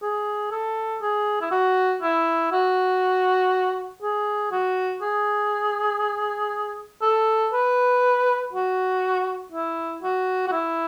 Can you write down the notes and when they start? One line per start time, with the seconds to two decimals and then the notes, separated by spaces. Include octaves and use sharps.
0.02 G#4
0.51 A4
1.02 G#4
1.42 E4
1.51 F#4
2.03 E4
2.52 F#4
4.03 G#4
4.52 F#4
5.02 G#4
7.02 A4
7.53 B4
8.53 F#4
9.52 E4
10.03 F#4
10.48 F#4
10.52 E4